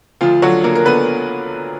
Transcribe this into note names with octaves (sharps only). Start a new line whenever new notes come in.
D2 F3 F4
D3 F#3 F#4
D3 A#3 A#4
A#4
D3 B3 B4